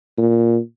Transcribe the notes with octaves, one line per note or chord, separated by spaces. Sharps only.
A#2